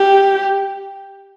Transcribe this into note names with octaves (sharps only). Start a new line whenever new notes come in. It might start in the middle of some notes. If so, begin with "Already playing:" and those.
Already playing: G4